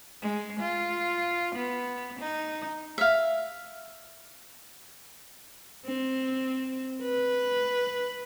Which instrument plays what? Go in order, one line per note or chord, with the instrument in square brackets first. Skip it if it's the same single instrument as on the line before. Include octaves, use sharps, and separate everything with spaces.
[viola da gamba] G#3
F4
B3
D#4
[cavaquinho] E5 F5
[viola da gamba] C4
B4